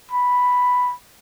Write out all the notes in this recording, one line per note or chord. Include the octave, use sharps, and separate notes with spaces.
B5